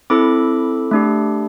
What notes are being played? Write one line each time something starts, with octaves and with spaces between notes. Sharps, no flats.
C4 E4 A4 B5 D6
A3 D4 G4